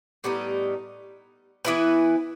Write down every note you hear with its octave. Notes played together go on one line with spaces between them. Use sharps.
A2 G3 B3 D#4
E3 B3 E4 B4